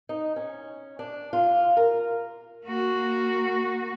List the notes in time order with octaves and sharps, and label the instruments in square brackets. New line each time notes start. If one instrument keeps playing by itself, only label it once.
[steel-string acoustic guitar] D#4
C#4
D4
F4
A#4
[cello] A#3 F#4